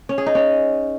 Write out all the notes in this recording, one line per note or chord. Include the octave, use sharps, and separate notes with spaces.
C#4
G#4
D#4
C#4